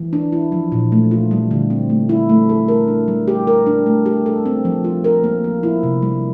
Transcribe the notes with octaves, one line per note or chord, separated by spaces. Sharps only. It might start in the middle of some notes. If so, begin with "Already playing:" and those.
Already playing: E3
D4
E4
F3
A#2
A3
F4
G3
D3
C4
A3
E4
A3
A4
A#4
D4
G3
G4
A#4
D4
A3
G4
A4
C4
F3
F4
A#4
A#3
F3
E4
C3
G3